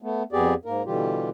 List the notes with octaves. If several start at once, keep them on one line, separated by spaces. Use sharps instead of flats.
A3 B3
F2 B3 G4 G#4 D5
G#2 A#3 A#4
B2 D3 E3 G3 F4 G4